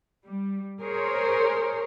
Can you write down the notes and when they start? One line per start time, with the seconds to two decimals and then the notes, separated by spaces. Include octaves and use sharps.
0.24 G3
0.82 G#4 A#4 C5 C#5